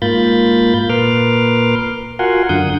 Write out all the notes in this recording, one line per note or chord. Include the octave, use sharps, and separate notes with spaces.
G#2 A#3 F4 B5 G6 A6
A#2 A#4 B4 C6 D6 F6
F4 F#4 A#4 F#5 G#5 C6
F#2 D3 F#5 D#6 G6